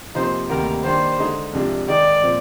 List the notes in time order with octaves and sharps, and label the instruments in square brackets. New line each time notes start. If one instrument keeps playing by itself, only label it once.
[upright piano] C3 F3 A#3 D#4 [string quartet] C5
[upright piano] D2 C3 D#3 G3 A#3 [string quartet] A#4
[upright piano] D#3 G3 A#3 D4 [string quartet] C5
[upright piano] D3 G#3 D#4 G#4
C2 C3 F3 G#3 D4
[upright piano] D#3 G#3 D#4 G#4 [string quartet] D5
[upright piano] A#2 F3 C4